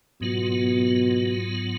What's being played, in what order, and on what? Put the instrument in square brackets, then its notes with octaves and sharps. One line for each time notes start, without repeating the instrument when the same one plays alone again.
[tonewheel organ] G#2 F#3 B3 F4 [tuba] B2